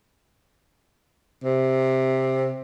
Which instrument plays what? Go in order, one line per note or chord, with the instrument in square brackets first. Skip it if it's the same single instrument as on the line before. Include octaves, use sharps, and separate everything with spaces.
[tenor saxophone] C3